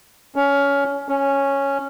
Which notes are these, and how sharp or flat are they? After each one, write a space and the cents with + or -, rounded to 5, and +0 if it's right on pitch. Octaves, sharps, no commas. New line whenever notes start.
C#4 +20
C#4 -5